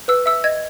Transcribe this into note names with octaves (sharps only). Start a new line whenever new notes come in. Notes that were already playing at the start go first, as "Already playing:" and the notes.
B4 E6
E5 E6
D#5 G#6